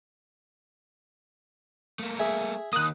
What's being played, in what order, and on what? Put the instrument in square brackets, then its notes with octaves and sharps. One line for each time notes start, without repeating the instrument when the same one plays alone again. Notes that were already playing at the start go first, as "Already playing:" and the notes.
[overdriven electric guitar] A3 A#3
[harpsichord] G#4 E5
[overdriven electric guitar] D#3 A#3 [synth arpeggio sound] D#6 F#6